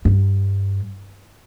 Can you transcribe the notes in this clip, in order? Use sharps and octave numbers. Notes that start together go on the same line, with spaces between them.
G2